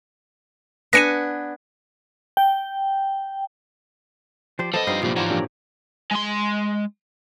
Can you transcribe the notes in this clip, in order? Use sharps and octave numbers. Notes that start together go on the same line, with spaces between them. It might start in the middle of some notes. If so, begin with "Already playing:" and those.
B3 D4 G#5 A#6 C#7 D#7
G5
F3 G4 C5 D5
F3 B3 A4 C5 D#5 A5
G2 G3 C4 D#4 F4 C5 F5
C2 A#2 F3 G3
G#2 E3 F3 C#5 D5 F#5 A#5 C6
A#2 D4 G4
G#3 C6